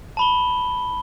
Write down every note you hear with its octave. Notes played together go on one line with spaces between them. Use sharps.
A5 B5 G7